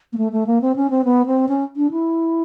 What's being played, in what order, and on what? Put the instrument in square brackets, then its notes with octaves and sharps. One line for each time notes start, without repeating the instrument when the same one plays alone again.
[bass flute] A#3
A3
A3
A#3
C4
C#4
C4
B3
C4
C#4
D4
E4